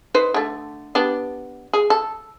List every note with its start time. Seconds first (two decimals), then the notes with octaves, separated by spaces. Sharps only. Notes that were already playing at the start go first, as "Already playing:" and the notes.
0.14 D#4 B4 C5
0.34 D3 A3
0.95 B3 D4 G4
1.73 G#4
1.90 A4